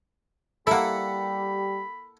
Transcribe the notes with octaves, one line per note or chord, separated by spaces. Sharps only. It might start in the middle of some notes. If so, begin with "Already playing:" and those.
G3 A#3 E4 G4 A4 F#5 B5